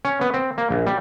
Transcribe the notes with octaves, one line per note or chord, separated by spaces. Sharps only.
C#4
B3
C4
A#3
A#1
G3